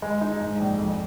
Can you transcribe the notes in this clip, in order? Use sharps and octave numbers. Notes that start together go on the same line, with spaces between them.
G#3
D#4
G#2
A#1
F2